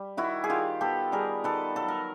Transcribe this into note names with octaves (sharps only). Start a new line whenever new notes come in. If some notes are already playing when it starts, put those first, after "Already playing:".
Already playing: G3
D#3 E4 F#4
G#4
D#3 F4 G4
B3 G4 A4
G3 G#4 A#4
D#3 A4 B4
F#3 A4
A#4